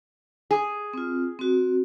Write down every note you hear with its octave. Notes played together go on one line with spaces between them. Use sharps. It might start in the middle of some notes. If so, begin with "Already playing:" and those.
G#4
C4 F4
C4 F#4